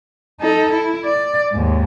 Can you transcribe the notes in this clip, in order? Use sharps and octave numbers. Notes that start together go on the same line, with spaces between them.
D#4 A4
E4
D5
D#2 G#2